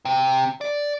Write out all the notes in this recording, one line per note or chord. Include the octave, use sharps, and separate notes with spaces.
C3
D5